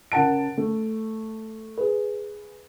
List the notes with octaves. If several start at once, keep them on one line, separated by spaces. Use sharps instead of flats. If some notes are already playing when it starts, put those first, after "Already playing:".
C#3 A#4 F#5 A5 D7
A3
G#4 B4